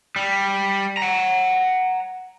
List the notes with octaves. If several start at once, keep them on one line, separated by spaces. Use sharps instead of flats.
G3
F#5 A#5